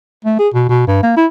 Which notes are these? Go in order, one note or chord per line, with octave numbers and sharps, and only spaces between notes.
A3
G#4
B2
B2
G2
A#3
E4